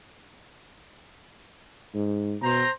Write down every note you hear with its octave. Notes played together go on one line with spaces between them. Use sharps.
G#2
B2 C5 A#5